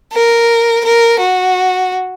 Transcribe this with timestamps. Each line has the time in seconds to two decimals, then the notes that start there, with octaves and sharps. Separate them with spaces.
0.13 A#4
0.85 A#4
1.19 F#4